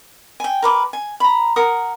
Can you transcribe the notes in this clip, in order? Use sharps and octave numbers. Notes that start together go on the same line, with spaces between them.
G5 G#5
A#4 B4 D6
G#5
A#5 B5
A#4 F#5 D#6